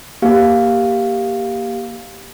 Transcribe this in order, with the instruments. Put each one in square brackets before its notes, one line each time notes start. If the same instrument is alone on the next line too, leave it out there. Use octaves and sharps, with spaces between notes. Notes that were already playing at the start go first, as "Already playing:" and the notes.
[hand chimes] A#3 G4 F5